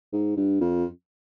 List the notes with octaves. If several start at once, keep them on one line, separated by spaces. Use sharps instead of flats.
G#2
G2
F2